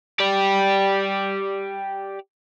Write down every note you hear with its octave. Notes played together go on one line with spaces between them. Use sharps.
G4 D5